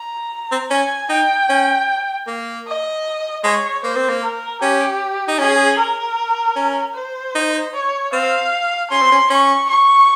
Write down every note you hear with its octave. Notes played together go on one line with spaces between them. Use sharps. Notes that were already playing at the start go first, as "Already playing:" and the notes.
Already playing: A#5
C4
C#4 G#5
D#4 G5
C#4
A#3
D#5
G#3 C#5
A#3 C5
C4
A#3
A#4
C#4 G4
D#4
C#4 G#4
A#4
C#4
C5
D#4
C#5
C4 F5
C#4 C6
C4
C#4
C#4 C#6
C#6